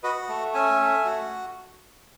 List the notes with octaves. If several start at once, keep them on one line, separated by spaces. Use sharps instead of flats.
F#4 B4 D#5
A3
C#4 E5 G#5
A3
F#4